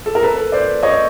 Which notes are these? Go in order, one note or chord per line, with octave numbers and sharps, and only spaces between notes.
A4
A#4
A4 B4
C5 D5
C#5 D#5